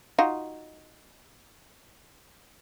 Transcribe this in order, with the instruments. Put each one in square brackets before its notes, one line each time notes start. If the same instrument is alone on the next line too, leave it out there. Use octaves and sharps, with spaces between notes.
[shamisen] D#4 F4 F#4